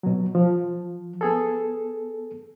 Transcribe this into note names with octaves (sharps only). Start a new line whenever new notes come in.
B2 F#3
F3
B3 G#4 A4